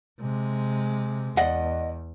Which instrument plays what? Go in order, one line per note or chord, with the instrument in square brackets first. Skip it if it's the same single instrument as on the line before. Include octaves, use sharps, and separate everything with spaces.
[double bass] C3 G#3
[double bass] E2 [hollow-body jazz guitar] D5 D#5 F#5